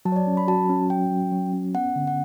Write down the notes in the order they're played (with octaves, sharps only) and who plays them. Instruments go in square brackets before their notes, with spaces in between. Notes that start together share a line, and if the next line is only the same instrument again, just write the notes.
[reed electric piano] F#3 [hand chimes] A5
[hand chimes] C#5
D5
[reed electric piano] C#4
[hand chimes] B5
[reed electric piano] F#4 [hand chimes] A5
[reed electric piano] C#4
[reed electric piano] F#3 [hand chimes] G5
[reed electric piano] F#3
F#3
C#4
[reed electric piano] B3 [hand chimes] F#5
[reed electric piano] D3
[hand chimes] F#5